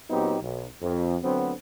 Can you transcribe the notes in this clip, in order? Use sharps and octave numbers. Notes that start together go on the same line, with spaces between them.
A#2 F#3 B3 C4 D#4 G4
B1
F2
D2 D3 F#3 B3 C4